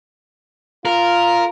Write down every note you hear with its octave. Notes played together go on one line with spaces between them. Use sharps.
F4 A#4